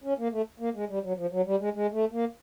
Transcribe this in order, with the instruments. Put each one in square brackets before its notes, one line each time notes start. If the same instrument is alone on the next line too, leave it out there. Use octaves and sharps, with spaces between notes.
[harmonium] C#4
A#3
A3
A#3
G#3
G3
F#3
F3
F#3
G3
G#3
G#3
A3
A#3